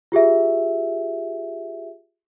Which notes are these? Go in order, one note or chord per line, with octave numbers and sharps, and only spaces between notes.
F4 G4 G#4 E5